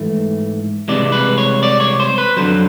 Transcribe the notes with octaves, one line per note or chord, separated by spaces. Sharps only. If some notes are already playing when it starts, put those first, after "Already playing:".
Already playing: G#2 E3 A3
C2 C3 E3 G#3 D5
B4
C#5
D5
C#5
C5
B4
F2 D3 F#3 C5